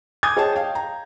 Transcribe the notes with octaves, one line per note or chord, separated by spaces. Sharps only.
G#5 D6 D#6 G6 G#6
G#4 C#5 D#5 G5 A5
F5 G5
A#5